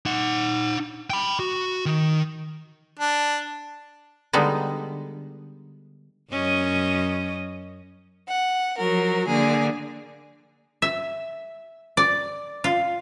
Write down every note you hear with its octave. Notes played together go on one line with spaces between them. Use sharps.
D#4 F#5
G5 B5
F#4
D#3
D4
D3 G3 G#3 B3 D#4
F#2 C#4 D#5
F#5
F3 F#3 A#4
D3 A#3 G#4
E5
D5
F4